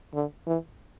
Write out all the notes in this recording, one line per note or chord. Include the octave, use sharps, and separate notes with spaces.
D3
E3